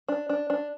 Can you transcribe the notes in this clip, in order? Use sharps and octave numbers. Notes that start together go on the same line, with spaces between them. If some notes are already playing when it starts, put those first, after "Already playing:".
D4
D4
D4